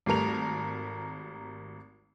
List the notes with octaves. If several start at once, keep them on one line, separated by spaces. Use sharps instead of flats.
G#1 G3 A3 A#4 F7